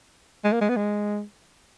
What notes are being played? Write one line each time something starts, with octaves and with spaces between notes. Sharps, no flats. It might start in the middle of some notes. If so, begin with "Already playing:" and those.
G#3
A#3
G#3
B3
G#3